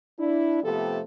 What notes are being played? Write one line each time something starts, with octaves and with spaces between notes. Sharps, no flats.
D4 E4
C3 F3 A3 B3 G4 A4